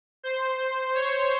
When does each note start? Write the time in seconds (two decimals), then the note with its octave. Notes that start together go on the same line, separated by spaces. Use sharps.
0.23 C5
0.95 C#5